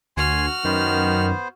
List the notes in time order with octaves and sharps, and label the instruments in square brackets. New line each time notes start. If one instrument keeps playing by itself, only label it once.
[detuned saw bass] D2 [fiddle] F#4 F6 [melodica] G#5 C6
[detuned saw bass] F#2 [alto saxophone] D#3 [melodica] B3 C5